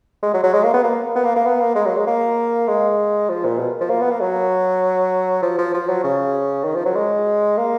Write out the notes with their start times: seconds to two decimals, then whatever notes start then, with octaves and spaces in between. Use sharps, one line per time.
0.23 G#3
0.33 F#3
0.44 F#3
0.53 G#3
0.64 A#3
0.74 B3
0.84 A#3
1.15 B3
1.24 A#3
1.36 A#3
1.46 B3
1.61 A#3
1.75 G#3
1.86 F#3
1.97 G#3
2.07 A#3
2.68 G#3
3.29 F3
3.45 A#2
3.59 B2
3.80 F3
3.90 A#3
4.01 B3
4.11 A#3
4.20 F#3
5.42 F3
5.58 F3
5.74 F3
5.89 F#3
6.04 C#3
6.65 D#3
6.75 F3
6.86 F#3
6.96 G#3
7.58 A#3